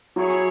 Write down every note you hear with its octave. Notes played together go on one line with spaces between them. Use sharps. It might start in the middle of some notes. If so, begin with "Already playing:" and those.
F#3 E4 G#4 C#5